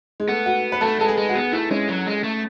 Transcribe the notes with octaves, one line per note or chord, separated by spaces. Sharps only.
G#3
A3 B3
F#4
B4
A3 A4
G#3 A4
G#4
G#3
F#4
B3 G#4
A3 E4
G#3 C#4
F#3
G#3
A3